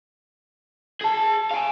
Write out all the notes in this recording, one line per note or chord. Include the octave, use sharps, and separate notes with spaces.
G#4 A5
F5 G#5